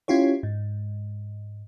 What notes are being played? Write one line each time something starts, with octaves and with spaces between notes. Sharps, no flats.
C#4 E4 F4 G4 C#5
G#2